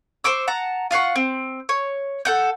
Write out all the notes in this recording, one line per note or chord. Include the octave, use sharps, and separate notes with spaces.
C5 C#6 D6 E6
F#5 A5 A#5
F4 F5 F#5 C#6
C4
C#5
A4 F#5 G6